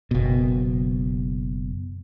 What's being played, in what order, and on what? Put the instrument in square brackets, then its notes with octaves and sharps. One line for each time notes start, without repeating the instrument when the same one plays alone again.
[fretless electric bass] F#1 B2